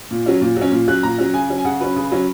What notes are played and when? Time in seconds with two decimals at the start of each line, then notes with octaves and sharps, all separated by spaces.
0.11 A#2
0.26 F#3 C#4
0.41 A#2
0.56 F#3
0.61 C#4
0.72 A#2
0.88 F#3 C#4 F#6
1.03 A#2 A#5
1.18 F#3 C#4
1.34 C#3 G#5
1.50 F#3 C#4
1.58 G#5
1.65 C#3 F#5
1.81 F#3 C#4 B4
1.96 C#3
2.12 F#3 C#4